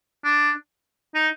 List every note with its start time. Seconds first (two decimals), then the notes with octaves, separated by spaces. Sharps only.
0.25 D4
1.15 D#4